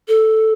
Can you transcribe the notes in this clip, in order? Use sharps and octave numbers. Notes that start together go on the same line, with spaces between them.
A4